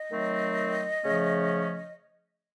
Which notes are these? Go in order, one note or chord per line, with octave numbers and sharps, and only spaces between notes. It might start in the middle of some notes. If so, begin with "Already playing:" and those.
Already playing: D#5
D#3 F#3 A3 C4
C#3 F3 A3 C#4